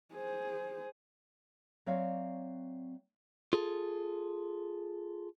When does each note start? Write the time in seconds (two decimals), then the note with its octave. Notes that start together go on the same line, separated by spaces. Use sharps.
0.14 G#4 C5
1.86 F#3 C4 C#5 D5 E5 F5
3.53 F4 G#4 A4